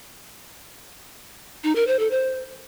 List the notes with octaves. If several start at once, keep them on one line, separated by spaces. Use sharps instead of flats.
D#4
A#4
C5
A4
C5